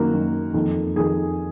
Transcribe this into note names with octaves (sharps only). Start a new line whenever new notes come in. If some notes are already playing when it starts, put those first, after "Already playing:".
Already playing: F#2 D#3 A#3 F#4
F#2 D#3
F2 D#3
F2 D#3 G#4